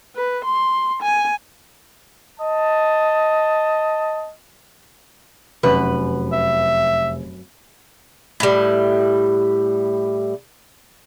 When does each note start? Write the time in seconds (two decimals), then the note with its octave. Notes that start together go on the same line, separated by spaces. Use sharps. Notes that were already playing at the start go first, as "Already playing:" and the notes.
0.16 B4
0.45 C6
1.03 G#5
2.39 D#5 A5
5.63 F1 F#2 B4
6.33 E5
8.40 A2 G3